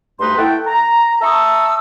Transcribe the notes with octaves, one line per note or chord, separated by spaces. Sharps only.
D2 G2 A3 D#4 B4 C6
A3 E4 A4 F#5 G5
A#5
E5 A5 A#5 C#6 D#6 E6